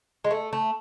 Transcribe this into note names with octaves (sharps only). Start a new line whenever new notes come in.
G#3
A3
A3